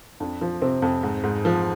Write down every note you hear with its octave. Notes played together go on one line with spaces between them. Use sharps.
F2 D4
F3
C3 C4
F2
G#2
G#2
F3